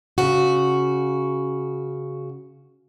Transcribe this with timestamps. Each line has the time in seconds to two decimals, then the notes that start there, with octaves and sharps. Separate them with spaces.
0.18 C#3 F#4